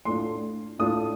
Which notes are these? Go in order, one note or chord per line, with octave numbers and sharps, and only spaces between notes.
A2 A3 D4 F4 C6
A2 A3 D4 F4 D#6